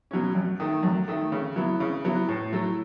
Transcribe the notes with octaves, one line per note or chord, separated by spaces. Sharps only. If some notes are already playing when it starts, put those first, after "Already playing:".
B2 F#3 C#4
F#2
D#3 A3
F#2
D#3 A3
C#3
F#3 B3 E4
C#3
F#3 B3 E4
A2
F#3 A3 E4